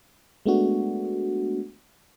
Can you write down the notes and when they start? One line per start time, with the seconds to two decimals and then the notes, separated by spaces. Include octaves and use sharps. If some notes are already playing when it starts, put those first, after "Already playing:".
0.46 G#3 A3 B3 D4 F#4